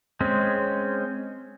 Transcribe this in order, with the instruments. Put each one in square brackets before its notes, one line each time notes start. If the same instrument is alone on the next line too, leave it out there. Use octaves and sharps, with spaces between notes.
[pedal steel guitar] G#3 C4 C#4